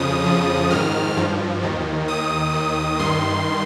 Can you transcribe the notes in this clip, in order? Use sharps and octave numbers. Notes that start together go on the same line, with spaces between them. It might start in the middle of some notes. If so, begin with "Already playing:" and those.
Already playing: F2 C#3 F3 D#6
F2 C#3 F3
G#2 D#3 F6
G2 F3
D#2 D#3
D#2 D#3 D#6
D#2 D#3
G2 D#3 C6